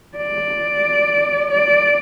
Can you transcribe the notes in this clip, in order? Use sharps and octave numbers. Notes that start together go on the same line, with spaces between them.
D5
D5